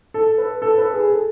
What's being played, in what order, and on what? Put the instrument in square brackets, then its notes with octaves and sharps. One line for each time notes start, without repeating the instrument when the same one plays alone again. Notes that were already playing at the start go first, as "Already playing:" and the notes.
[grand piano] A4
B4
A4
B4
G#4
A4